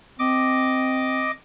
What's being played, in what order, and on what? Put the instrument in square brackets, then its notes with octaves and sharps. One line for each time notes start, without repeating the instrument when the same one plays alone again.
[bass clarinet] C4 [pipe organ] D#5 D6